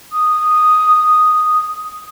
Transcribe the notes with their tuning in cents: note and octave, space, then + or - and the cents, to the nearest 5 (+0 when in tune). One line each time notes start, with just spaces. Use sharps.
D#6 -5